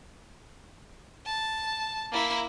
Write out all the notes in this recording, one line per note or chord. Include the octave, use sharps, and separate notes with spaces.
A5
A#3 E4